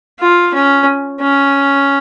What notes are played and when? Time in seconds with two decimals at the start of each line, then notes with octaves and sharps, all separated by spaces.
0.19 F4
0.54 C#4
1.21 C#4